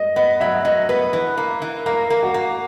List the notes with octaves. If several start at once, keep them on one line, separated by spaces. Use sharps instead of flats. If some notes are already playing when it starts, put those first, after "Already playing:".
Already playing: D#5
B3 D#5
F#3 E5
F#3 D#5
B3 B4
E3
A#3
E3
A#3 A#4
A#3
F#4
A#3